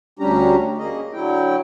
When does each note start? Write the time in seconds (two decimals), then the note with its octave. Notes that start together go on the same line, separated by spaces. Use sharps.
0.19 D2 G3 C#4 D4 G4 A#5
0.78 A#3 C#4 G#4 D#5
1.13 D3 F#3 E4 G5